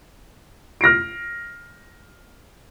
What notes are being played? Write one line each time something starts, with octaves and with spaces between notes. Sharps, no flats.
F6 A#6 C7 D7